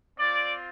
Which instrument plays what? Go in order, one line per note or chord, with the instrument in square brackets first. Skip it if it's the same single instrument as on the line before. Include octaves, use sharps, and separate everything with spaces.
[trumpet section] C4 F4 D5